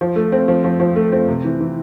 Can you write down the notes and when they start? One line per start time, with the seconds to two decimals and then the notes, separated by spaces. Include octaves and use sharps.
0.01 F3
0.16 A3
0.32 C4
0.48 F3
0.64 F3
0.80 F3
0.96 A3
1.12 C4
1.29 C3
1.44 E3
1.60 E3